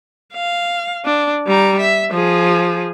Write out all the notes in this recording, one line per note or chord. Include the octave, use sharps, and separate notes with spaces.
F5
D4
G3 A#5
E5
F3 G#4